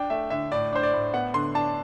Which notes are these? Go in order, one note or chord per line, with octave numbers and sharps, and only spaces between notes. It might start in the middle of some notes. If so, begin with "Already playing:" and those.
Already playing: D4 G5
A3 E5
D3 E5
A2 D5
D4 C5
D5
A2
B3 F#5
D3 C6
D4 A5